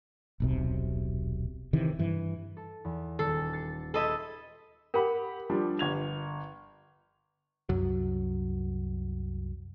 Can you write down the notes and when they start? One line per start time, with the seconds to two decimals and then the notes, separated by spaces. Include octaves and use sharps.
0.40 D#1 B1 C3
1.73 C3 D#3 E3
1.99 G2 E3
2.57 A4
2.85 E2
3.19 D#1 A4
3.53 A6 C7 C#7
3.94 A4 D#5 E5 B5 C6 G#6
4.94 G4 A#4 F#5 B5
5.50 F3 G3 D4
5.79 G1 G#6 F7
7.69 C2 F#2 F#3